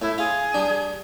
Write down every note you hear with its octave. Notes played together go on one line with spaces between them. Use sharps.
A2 E4
F4 G#4
G3 D4